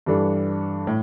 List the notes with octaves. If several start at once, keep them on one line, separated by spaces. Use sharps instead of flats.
G2 E3 G3 D4 A4
A2